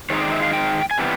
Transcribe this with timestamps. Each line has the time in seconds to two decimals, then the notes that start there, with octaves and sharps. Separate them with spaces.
0.10 D#3 G#3 C4 D#4 C#5
0.21 D5
0.32 E5
0.42 F5
0.53 G5
0.91 G#5
0.98 C3 E3 G3 B3